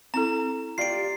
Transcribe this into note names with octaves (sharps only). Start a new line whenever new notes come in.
C4 E4 A4 A#5
F4 G4 D5 C7 D7